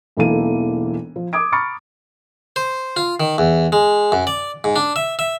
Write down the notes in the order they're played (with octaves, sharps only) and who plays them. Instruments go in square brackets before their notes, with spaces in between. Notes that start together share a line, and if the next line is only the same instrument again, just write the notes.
[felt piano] E1 B1 E3 A#3 A4 D#7
F3
D6 D#6 G#6 D7
A#5 B5 C#6 F6 A6 C#7
[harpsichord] C5
F4
D#3
E2
G#3
F#2
D5
G#2
D4
E5
E5